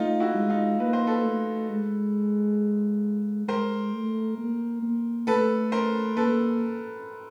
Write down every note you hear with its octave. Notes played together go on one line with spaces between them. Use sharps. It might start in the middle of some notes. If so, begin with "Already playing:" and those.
Already playing: A3 D#4 F4
E4 F#4
G#3
D#4 F4
A#3 B4
C5
A4 B4
A3
G#3
G#3 A#4 C5
A3
A#3
A#3
A3 A4 B4
A#4 C5
A#3 A4 B4